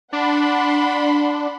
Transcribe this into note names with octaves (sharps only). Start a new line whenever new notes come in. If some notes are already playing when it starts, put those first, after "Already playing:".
D4 F#5 B5 C6